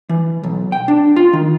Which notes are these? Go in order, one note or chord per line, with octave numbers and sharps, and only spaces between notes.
E3
B1
G5
D4
F4
D#3